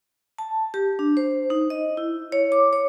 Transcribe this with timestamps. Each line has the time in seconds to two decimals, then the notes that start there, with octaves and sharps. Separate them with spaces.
0.39 A5
0.74 G4
0.99 D4
1.17 C5
1.50 D#4
1.70 D#5
1.97 E4
2.32 C#5
2.52 D6
2.73 C#5